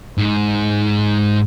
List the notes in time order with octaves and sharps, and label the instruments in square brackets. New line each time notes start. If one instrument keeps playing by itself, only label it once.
[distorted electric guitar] G#2